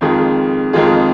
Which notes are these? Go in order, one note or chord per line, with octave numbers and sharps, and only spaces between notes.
F2 D#3 G#3 F4 G#4
F2 D#3 G#3 F4 G#4